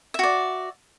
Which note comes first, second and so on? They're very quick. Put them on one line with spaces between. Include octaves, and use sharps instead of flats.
E5 F#4 D5